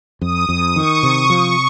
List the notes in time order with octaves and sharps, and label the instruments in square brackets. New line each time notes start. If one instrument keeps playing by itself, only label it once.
[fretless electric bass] F2 [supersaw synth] D#6
[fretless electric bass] F2
[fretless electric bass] D#3 [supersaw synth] C#6
[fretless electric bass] C3
[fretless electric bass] F3 [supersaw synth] C#6